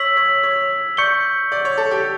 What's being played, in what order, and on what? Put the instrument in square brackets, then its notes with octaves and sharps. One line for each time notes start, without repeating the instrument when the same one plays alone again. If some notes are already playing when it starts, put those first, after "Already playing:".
Already playing: [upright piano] C#5 [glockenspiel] E6 B6 F#7
[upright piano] C#5
C#5
[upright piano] D5 [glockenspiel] C#6 G6 C#7 G7
[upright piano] D5
C#5
A4
G4